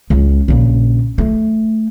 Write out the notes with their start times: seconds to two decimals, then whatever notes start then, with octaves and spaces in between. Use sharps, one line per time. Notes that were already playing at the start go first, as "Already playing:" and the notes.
0.10 C#2
0.48 A#1 C#3
1.18 A3